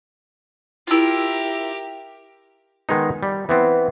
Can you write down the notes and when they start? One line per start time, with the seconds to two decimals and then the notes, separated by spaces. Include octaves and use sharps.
0.87 E4 F4 G4 A#4
2.89 D#3 G#3 B3 D#4
3.23 G3
3.49 E3 B3 C4